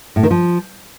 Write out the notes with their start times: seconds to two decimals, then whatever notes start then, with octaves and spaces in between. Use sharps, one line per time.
0.16 A2
0.23 D#3
0.31 F3